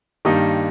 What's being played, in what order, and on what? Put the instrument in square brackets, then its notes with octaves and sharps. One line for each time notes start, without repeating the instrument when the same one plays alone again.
[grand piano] G2 D#3 G3 A#3 D#4